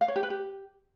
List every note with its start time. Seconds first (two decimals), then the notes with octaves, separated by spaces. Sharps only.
0.01 F5
0.08 C#5
0.16 G4
0.23 B4
0.30 G4